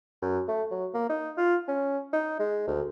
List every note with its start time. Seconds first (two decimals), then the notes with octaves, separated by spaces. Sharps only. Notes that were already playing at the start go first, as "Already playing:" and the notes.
0.22 F#2
0.48 A3
0.71 F#3
0.94 A#3
1.09 D#4
1.37 F4
1.68 C#4
2.13 D#4
2.39 G#3
2.67 D2